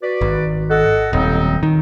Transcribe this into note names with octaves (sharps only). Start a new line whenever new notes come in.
F#4 B4 D5
G#1
A4 D#5 F#5
D#1 F#3 C4 D#4
D#3